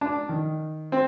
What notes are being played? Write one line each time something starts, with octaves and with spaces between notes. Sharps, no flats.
D4
D#3
C4